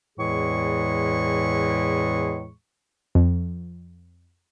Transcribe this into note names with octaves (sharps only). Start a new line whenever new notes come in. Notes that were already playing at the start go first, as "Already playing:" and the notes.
E2 A2 E3 G#3 G#4 C#6
F2